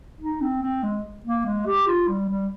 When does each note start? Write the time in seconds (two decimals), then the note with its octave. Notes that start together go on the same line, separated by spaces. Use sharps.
0.21 D#4
0.41 C4
0.62 C4
0.83 G#3
1.25 A#3
1.46 G#3
1.66 G4
1.87 F4
2.08 G3
2.29 G3